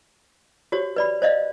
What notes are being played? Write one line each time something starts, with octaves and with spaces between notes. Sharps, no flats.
F#4 G4 C5 C#5
B4 D5 B5
C5 D5 D#5 F5